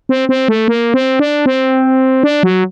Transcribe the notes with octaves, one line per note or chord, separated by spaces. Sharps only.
C4
C4
A3
A#3
C4
D4
C4
D4
F#3